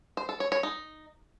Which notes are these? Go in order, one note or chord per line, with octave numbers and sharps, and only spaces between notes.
C5
A4
C#5
C#5
D#4